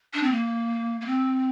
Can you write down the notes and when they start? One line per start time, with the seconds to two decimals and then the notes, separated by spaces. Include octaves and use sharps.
0.14 D4
0.23 C4
0.32 A#3
1.01 A#3
1.06 C4